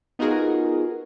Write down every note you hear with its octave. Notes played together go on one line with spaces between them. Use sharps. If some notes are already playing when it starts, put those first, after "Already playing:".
B3 D#4 F4 F#4 G#4 A#4